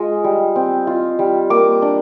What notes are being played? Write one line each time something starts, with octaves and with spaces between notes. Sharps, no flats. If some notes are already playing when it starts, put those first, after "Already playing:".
Already playing: G#3 F4 D#5
G3
C4
F4
G3
A#3 D6
D4